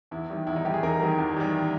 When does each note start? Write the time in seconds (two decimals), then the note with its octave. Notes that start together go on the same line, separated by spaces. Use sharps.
0.11 E2 E4
0.30 D#3 G3
0.47 E2 E4
0.56 D#4
0.65 D#3 G3 G4
0.74 G#4
0.83 E2 A#4
1.01 D#3 G3
1.18 E2
1.36 D#3 G3